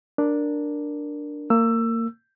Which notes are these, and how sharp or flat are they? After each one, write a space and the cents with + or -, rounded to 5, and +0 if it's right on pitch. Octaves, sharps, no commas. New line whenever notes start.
D4 +0 A#4 +0
A#3 -25 E6 +15